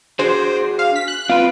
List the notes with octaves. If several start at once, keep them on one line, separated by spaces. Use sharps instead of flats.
D4 F#4 G#4 C5
F5
B6
F#6
C4 F4 B4